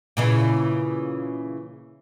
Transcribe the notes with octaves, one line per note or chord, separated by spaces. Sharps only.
A#2 C#3 E3